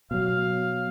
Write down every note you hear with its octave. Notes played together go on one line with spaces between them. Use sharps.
B2 F#3 F5